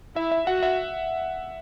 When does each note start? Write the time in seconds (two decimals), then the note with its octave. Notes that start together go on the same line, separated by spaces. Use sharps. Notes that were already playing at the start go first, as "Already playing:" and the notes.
0.16 E4 E5
0.32 E5
0.47 F#4 F#5
0.63 E5